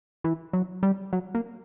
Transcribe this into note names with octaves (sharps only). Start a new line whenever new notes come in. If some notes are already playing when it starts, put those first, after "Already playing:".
E3
F#3
G3
F#3
A#3